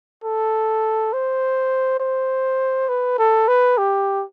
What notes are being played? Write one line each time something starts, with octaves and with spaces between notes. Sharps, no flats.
A4
C5
C5
B4
A4
B4
G4